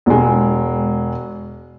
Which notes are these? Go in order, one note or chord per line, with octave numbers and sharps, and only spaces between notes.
E1 G#3